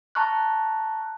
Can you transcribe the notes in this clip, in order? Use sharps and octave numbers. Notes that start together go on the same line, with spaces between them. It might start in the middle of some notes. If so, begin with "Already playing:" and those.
A5 A#5 C#6 F6 F#6